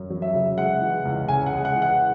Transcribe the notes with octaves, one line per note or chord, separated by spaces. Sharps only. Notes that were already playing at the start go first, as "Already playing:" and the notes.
Already playing: F#2
F#3
E5
C#3
G#3 F#5
E3
C#2
C#3 G#5
F#5
G#3
F#5
E3
F#5